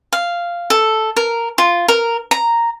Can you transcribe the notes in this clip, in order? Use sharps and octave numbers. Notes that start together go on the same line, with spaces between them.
F5
A4
A#4
F4
A#4
A#5